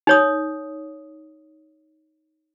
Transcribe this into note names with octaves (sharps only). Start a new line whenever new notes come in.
D#4 C#5 D#6